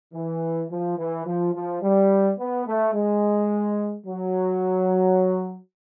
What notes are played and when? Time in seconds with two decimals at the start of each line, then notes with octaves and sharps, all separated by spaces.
0.14 E3
0.71 F3
0.98 E3
1.26 F3
1.55 F3
1.82 G3
2.39 B3
2.66 A3
2.94 G#3
4.07 F#3